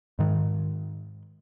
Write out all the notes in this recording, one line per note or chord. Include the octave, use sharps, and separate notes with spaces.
G#2 D#3